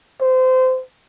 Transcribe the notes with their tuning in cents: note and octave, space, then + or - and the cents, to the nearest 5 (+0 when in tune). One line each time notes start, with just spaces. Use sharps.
C5 -25